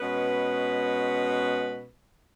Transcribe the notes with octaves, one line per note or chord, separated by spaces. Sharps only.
B2 G#3 B3 C#4 B4